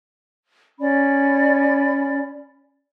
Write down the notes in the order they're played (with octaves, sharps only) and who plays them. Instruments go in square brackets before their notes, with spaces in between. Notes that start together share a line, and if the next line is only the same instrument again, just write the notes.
[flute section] C#4 D5 B5